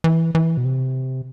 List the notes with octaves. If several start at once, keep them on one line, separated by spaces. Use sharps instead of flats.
E3
E3
B2
C3